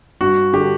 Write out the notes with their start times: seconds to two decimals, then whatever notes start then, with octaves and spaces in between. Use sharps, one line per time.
0.21 G2 F#4
0.53 D3 G4